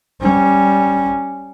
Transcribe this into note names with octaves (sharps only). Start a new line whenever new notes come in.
G3 C#4